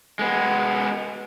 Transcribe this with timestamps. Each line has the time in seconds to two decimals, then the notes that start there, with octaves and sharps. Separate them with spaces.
0.19 G#3 B3